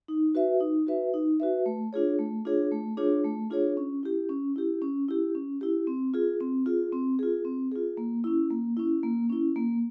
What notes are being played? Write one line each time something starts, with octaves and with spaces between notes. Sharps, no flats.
D#4
F#4 B4 E5
D#4
F#4 B4 E5
D#4
F#4 B4 E5
A3
D4 F4 G#4 C#5
A3
D4 F4 G#4 C#5
A3
D4 F4 G#4 C#5
A3
D4 F4 G#4 C#5
C#4
E4 G4
C#4
E4 G4
C#4
E4 G4
C#4
E4 G4
C4
F4 G#4
C4
F4 G#4
C4
F4 G#4
C4
F4 G#4
A#3
C#4 E4
A#3
C#4 E4
A#3
C#4 E4
A#3